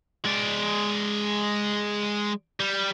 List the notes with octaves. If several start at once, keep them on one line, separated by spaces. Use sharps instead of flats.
G#3 D5
G3